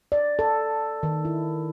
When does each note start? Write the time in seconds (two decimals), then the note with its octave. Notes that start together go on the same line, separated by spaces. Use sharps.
0.12 D5
0.39 A4
1.03 D#3
1.25 E4